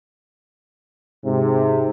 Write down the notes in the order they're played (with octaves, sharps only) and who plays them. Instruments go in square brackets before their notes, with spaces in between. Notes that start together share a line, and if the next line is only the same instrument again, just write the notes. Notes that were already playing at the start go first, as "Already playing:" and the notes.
[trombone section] G#2 C3